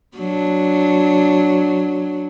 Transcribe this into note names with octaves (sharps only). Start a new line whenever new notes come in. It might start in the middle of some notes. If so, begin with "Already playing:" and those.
F#3 D4